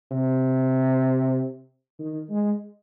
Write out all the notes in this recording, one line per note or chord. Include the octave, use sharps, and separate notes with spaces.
C3
D#3
G#3